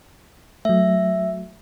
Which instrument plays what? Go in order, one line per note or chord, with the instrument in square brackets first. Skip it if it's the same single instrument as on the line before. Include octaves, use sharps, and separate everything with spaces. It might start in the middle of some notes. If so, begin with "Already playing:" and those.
[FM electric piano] F#3 A3 [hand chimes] E5